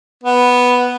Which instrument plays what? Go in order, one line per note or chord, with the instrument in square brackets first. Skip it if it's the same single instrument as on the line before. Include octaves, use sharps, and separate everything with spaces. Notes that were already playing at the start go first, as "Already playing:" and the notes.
[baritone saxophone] B3